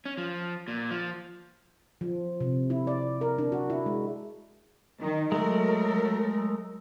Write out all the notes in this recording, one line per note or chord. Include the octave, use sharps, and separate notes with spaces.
C#4
F3
A#2
F3
F3
C3
E4
D5
A#4
D4
F#4
E4
G#3
D#3
F#3 G#3 A3 A#4